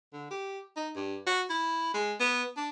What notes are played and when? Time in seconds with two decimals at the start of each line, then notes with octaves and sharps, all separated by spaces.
0.13 D3
0.31 G4
0.76 D#4
0.96 G2
1.27 F#4
1.50 E4
1.94 G#3
2.20 B3
2.57 D4